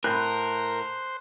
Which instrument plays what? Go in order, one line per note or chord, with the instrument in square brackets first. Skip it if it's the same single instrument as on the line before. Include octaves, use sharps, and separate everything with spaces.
[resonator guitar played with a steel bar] A2 [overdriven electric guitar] A#4 [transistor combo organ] C5 [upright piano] F#6 G6